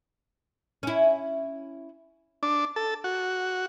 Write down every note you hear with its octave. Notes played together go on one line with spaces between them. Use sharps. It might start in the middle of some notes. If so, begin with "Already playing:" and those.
C#4 E4
D4
A4
F#4